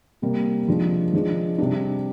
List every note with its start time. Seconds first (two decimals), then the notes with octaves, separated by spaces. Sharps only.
0.22 C3 G3 A#3
0.68 C3 F3 G#3 D4
1.13 F3 G#3 D4
1.58 C3 G3 D4